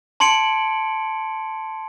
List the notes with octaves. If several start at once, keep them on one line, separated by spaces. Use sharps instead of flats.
A5 C6 G#6 C#7 D7 F#7